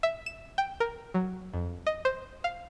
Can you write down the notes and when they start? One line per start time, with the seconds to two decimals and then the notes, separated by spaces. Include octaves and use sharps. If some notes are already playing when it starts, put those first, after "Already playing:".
0.03 E5
0.26 E7
0.58 G5
0.80 A#4
1.14 F#3
1.53 F2
1.87 D#5
2.05 C5
2.44 F5